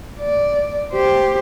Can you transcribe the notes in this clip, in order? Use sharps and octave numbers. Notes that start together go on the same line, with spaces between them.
D5
G4 C5